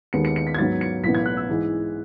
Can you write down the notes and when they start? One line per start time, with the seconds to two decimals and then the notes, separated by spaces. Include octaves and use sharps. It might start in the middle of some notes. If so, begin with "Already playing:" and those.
0.13 D#2 D#3 G#3 B3 C#7
0.25 C#7
0.36 C#7
0.47 B6
0.54 G#6
0.58 G#2 F#3 B3 A6
0.81 C#7
1.03 B1 A2 E3 B3 B6
1.15 G#6
1.26 F#6
1.37 E6
1.49 G#2 E3 G#3